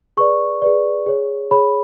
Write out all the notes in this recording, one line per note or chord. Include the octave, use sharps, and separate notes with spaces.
G#4 B4 D5 C#6
G#4 B4 D5
G#4 C#5
G#4 C#5 B5